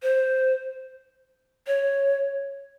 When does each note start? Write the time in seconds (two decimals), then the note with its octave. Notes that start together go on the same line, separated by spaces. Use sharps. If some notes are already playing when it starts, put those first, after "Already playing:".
0.03 C5
1.67 C#5